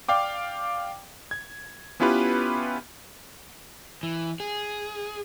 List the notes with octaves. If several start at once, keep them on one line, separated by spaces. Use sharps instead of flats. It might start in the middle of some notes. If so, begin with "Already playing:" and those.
D5 F5 G5 D6
G#6
B3 C#4 E4 F4 G4 B4
E3
G#4